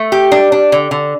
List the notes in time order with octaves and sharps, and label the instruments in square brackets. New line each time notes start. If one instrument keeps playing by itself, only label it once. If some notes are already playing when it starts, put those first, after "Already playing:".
Already playing: [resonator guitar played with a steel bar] A3
G4
D4
D4
D3
D3